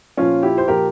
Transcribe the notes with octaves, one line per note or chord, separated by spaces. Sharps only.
A#2 F3 C#4 F4
E4 G4
C5
A#2 F3 G4 A#4